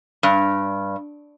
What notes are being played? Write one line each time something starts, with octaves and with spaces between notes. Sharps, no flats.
G2